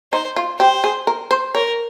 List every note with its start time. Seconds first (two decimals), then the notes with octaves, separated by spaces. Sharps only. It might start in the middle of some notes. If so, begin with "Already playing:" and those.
0.12 D#4 C5
0.36 F4
0.60 G4 C5
0.84 G#4
1.07 A#4
1.31 C5
1.55 A#4 C#5